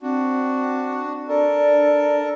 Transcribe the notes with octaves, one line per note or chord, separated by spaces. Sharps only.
C4 D4 F#4
D4 A4 A#4 D5